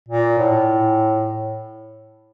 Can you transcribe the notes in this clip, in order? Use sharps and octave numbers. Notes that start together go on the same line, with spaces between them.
A#2
A2